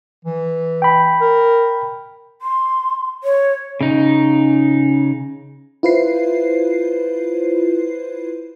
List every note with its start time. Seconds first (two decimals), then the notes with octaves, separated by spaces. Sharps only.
0.25 E3
0.82 G5 B5
1.21 A#4
2.42 C6
3.24 C#5
3.81 C#3 D#4
5.83 E4 F4 B4 C5 C7